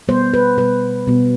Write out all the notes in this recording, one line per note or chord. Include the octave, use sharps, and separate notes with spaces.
B2 G3 B3 C5
B4
B2 G3 B3 B4
B2 G3 B3